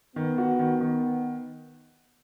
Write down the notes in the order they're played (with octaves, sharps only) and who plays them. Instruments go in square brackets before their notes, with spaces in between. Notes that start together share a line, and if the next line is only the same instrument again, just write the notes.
[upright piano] D#3 [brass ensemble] B3
[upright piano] F#4
D#3
D#3